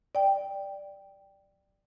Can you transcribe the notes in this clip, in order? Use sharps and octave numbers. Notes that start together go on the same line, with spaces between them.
D5 G5